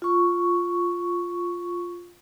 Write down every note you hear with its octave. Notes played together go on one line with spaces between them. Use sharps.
F4 C#6